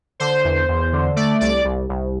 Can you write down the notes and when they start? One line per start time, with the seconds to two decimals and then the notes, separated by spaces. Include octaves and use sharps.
0.20 D3 C5
0.44 E2
0.68 E2
0.93 D3
1.16 A3 D5
1.41 C2 D5
1.65 C2
1.89 C2